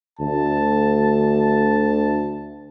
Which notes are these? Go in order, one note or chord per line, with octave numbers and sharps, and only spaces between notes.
D2 A5